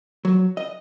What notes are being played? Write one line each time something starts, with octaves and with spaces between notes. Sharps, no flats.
F#3
D#5